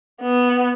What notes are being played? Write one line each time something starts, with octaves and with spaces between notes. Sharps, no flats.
B3